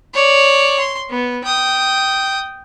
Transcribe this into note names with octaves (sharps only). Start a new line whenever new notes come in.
C#5 D5
C6
B3
G5 D#6